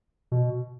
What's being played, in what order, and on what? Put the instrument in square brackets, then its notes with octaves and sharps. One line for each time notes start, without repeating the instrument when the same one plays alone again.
[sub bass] B2